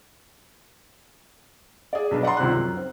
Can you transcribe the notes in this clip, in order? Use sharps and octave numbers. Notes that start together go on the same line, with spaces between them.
G#4 D5
B1 D4 B4
D5 F#5 A#5 C6
C#2 C3 D#3 F#6
F#2
C4